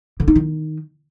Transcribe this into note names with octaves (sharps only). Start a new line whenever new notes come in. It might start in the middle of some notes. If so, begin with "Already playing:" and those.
D3
D#4
D#3